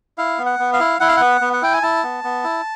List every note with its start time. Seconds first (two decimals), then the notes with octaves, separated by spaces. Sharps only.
0.18 E4 F5
0.39 B3
0.46 F#5
0.59 B3
0.73 F5
0.80 E4
1.00 E4 F#5
1.08 F5
1.17 B3 F#5
1.41 B3
1.53 F#5
1.62 E4 G5
1.73 G#5
1.83 E4 A5
2.03 B3
2.24 B3
2.44 E4